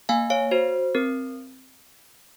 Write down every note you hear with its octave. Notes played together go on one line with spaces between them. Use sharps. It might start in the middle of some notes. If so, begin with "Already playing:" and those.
A#3 F5 G#5
C#5 F5
F#4 C5
C4 A#4